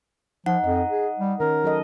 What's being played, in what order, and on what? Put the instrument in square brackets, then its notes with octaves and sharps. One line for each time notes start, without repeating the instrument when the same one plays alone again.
[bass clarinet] F3 [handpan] D#4 [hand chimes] F#5
[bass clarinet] F2 [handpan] D#5
[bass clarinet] G#4
G3
[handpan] D#3 C#4 [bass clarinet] A#4
[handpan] F#3 A4 D#5